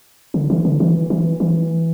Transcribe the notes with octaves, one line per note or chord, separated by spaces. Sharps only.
D3
E3
D3
E3
E3
E3